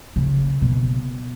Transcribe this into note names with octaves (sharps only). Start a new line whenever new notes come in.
C#3
B2